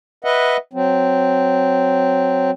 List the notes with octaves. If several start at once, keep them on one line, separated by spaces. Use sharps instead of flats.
B4 D#5 E5 F#5
F#3 C4